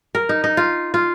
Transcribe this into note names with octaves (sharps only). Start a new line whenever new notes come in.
A#4
D#4
D#4
F4
F4